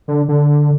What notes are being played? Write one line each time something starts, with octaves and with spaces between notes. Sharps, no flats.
D3
D3